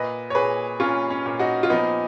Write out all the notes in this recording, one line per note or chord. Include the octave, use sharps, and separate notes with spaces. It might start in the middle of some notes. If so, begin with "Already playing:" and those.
Already playing: A#2 B4 D#5
C#5
A#2 G#4 B4
A#2 C#4 F4
C#4
A#2
D#4 F#4
F4
F3 B3 D#4